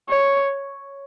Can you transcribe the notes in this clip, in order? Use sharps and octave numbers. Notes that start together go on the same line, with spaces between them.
C#5